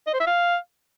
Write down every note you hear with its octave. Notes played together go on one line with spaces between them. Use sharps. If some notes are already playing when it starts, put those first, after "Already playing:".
D#5
C5
E5
F5